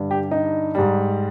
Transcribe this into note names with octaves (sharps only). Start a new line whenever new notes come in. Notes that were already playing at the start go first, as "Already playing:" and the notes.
Already playing: G2 D3 G3
G4
D#4
G#2 G3